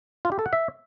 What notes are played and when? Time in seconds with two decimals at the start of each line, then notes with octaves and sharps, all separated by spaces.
0.25 F4
0.32 G4
0.39 A4
0.46 F#5
0.53 E5